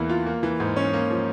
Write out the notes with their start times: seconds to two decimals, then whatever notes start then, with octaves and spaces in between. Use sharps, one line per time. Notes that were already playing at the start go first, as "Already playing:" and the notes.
Already playing: E2 E3 A#3 E4
0.10 F4
0.26 A#3
0.43 E3
0.60 G#2
0.76 C#4
0.93 A#3
1.10 F3